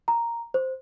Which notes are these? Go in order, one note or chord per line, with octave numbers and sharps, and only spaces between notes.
A#5
C5